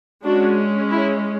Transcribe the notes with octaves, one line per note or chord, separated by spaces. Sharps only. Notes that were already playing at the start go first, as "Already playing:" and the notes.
G#3 C#4 D4 F#4
E4